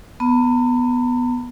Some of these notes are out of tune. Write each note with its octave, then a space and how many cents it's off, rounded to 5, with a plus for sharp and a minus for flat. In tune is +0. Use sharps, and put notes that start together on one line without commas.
B3 +0 A#5 -45